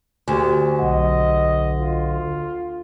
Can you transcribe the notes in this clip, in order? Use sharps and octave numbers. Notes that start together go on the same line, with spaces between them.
D2 G4 G#5
B1 D#5 F#5
F4